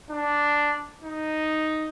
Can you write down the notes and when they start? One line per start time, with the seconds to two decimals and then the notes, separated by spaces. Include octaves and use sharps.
0.10 D4
1.03 D#4